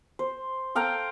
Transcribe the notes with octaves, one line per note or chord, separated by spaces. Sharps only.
C5
A4 F5 G5 A#5